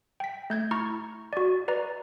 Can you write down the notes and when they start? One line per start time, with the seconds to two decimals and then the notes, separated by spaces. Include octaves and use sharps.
0.20 G5 B6
0.50 A3 G6 G#6
0.71 E4 A#5 C#6
1.33 F#4 D5
1.68 B4 D5 A#5